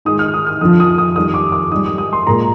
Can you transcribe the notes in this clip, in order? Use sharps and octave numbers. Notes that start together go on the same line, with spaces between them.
G#2 D#3 G#3 D#6
F6
D#6
F6
F2 D3 F3 D#6
D#6
D#6
F2 D#3 G3 D#6
D6
D6
G#2 G3 D#6
D#6
D#6
C6
A#2 G#3 A#5